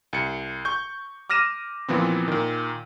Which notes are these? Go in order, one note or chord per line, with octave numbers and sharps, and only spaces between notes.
C2 C#7
C#6 G6
D6 F6 A#6 D#7 E7
A#2 E3 F3 B3 C4
A#2 D#3